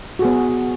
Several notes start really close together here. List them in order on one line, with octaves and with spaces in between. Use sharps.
F#4 G#4 B3